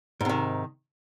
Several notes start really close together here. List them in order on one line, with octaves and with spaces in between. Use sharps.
G#2 C3 D#3